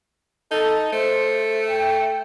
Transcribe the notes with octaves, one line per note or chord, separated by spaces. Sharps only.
D#4 A4
A3 C5
G5